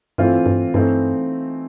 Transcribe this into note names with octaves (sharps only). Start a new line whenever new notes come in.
G2 E3 A3 C4 F4
G2
G2 E3 A3 C4 D#4